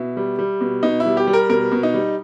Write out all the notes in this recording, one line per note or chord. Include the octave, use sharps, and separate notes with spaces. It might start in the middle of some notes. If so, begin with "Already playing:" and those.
Already playing: B2 E4
G3
G3
B2
B2 D#4
E4
G3
G4
G3
A#4
B2 A#4
B2
D#4
G3